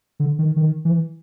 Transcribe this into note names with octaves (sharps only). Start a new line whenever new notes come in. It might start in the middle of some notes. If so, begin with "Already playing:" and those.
D3
D#3
D#3
E3